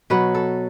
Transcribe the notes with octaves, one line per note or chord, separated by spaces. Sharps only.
B2 F#3 B3 B4
A4